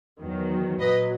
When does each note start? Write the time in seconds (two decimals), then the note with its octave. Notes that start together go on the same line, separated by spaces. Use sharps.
0.20 E2 D#3 F#3
0.80 A#2 F#3 B4 D#5